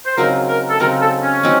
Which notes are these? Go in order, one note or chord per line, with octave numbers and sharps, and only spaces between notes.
C5
C#3 F#3 C4 D#4 A#4
A#4
A4
C#3 F#3 C4 D#4 A#4
A4
C#4
F#3 C4 D#4